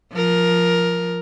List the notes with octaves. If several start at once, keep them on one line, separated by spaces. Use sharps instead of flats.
F3 A#4